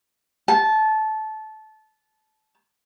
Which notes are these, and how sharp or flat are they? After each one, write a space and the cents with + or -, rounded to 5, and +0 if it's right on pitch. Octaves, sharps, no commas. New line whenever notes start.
A5 -20